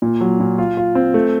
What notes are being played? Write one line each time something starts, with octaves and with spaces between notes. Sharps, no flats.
A#2
F#3
A#2
F4
F4
C4
A3